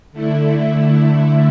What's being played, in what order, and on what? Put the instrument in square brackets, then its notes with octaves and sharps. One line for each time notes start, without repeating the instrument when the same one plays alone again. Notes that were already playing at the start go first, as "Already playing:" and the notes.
[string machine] D3 A3 E4